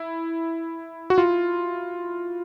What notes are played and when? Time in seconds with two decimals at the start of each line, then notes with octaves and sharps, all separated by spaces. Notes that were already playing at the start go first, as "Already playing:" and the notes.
Already playing: E4
1.10 F#4
1.18 F4